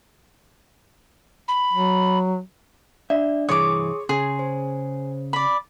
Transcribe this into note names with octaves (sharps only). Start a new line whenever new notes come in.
B5
F#3
D4 D5 E5
C2 G2 E3 G#4 C#5 C6 D6 D#6
C#3 G#4 C6
C5
D5 B5